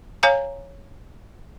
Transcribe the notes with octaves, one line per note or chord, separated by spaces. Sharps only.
C#5 F5 G#5 A#5